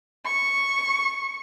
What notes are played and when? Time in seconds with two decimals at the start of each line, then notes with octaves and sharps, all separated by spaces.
0.24 C#6